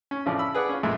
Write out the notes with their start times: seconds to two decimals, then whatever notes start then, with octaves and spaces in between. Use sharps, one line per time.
0.11 C#4
0.26 A1 C#3 F3 D5
0.39 B5 E6
0.54 G#4 B4 D5 F#5
0.69 C#4 F4
0.83 A#1 G#3 A3